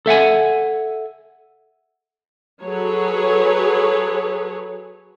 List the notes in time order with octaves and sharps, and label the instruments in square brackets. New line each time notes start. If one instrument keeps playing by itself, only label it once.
[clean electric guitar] A4 E5 F#5 G#5
[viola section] F#3 G#4 A4 B4 C#5